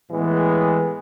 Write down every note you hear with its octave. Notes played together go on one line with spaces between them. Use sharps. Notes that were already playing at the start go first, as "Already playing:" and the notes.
A2 E3 G#3 B3